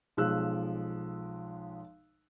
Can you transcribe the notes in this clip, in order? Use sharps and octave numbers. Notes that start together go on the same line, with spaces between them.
B1 F3 G#3 E6 F#6